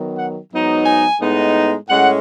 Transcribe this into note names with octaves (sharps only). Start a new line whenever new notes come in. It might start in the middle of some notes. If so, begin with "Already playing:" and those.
Already playing: D#3 F#3 B3
F#5
G#2 F#3 B3 D#4
G#5
A2 G#3 B3 D#4
A2 G#3 C#4 F#5